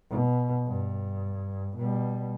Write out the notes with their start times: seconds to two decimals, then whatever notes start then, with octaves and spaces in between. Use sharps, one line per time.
0.10 B2
0.66 G2
1.77 B2 G3